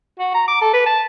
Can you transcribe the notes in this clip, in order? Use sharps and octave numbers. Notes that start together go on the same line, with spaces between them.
F#4
A#5
D6
A4
B4
A5